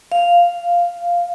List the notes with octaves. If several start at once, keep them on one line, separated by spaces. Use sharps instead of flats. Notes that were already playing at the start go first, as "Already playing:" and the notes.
F5